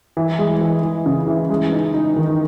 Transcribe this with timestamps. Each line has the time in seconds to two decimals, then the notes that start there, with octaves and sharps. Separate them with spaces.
0.17 E3
0.39 G#3
0.61 E3
0.83 E3
1.06 C#3
1.28 E3
1.50 G#3
1.72 D#4
1.94 D#4
2.17 D#3